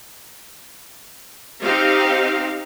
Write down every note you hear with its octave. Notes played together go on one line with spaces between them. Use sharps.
C4 D#4 G4 F5